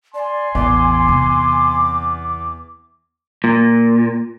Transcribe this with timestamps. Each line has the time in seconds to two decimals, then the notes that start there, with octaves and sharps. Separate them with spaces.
0.14 D5 G#5 C6
0.55 A1 E2 D6
1.09 C3
3.44 A#2